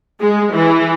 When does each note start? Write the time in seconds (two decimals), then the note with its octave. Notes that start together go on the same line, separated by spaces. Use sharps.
0.21 G#3
0.54 E3